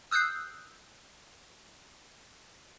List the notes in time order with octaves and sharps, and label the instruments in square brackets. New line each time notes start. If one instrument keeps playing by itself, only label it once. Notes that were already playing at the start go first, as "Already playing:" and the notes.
[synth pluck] D#6 E6 F#6 G6 C7